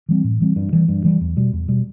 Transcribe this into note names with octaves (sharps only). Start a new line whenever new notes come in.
E3 G3 C4
A2
E3 G3 C4
G2
E3 G3
G2
E3 G3
E2
B2 G3
E2
B2 G3